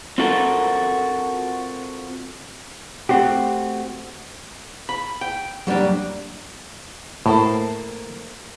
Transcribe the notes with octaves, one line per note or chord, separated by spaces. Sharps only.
C4 F4 F#4 A4 A#4
A3 C4 F#4 G4
B5
G5
F#3 G3 A#3 D4
A2 A#3 A4 C5